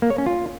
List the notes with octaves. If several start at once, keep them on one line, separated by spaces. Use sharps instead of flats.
A#3
C#5
C#4
F4